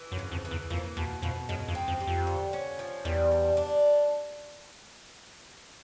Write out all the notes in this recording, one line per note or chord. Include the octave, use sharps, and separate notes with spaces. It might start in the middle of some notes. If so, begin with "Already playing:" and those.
Already playing: E3
F#2
C#3
F2
E3
E2
F2 A#3
E2 B2
F2 B2
F#2 G#3
F2
C4
F2
G4
F2
D3
C#4
F3
E2 G3
D4
D4